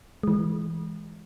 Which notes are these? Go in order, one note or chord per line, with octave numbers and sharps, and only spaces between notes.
E3 G#3